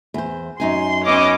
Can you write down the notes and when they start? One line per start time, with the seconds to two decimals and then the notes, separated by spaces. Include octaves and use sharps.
0.14 E2 C5
0.60 F#2 D#4 G#5 C6
1.05 B3 C#4 D#5 D6